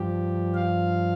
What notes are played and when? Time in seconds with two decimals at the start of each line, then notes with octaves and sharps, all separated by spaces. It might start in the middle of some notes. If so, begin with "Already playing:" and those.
Already playing: G2 F3 G4
0.54 F5